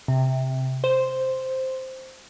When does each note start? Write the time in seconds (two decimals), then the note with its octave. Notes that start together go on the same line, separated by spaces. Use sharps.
0.08 C3
0.84 C5